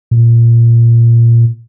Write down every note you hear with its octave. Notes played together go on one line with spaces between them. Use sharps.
A#2